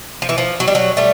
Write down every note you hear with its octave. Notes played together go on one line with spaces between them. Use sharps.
F3
E3
F3
F#3
G3
F#3
G3 A3